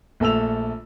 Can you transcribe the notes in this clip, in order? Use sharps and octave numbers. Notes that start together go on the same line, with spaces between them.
A#1 A3 A4 E6 F7